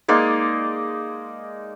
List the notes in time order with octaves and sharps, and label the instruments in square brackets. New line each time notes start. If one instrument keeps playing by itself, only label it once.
[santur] G#3 A#3 D#4 D5